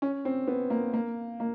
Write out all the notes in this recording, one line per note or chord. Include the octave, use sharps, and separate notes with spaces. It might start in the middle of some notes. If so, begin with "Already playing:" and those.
C#4
C4
B3
A#3
A#3
A#3